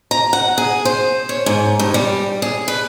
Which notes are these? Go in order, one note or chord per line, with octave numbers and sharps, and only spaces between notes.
A#5
F#5
G#4
C5
C#5
G#2
G2
G3
G#4
B4